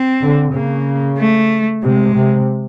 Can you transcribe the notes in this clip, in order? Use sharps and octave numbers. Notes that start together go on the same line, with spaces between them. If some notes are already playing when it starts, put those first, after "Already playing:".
Already playing: C4
D3
C#3 A#3
A3
C3 G#3
C3